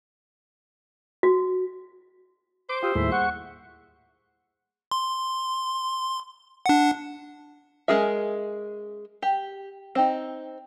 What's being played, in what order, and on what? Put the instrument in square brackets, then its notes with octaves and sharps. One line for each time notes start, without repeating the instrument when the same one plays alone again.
[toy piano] F#4
[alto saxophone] C5 [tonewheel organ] D6
[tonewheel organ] F4 [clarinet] G4 [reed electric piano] G5 D#6 E6
[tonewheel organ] D#2 A2 E4 [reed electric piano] G3 A#3 G#4 [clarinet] E5
[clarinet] F#5 [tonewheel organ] C#6
[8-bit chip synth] C6
D4 F#5
[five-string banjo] G#3 C#4 G#4 A#4 E5
G4
C4 D#4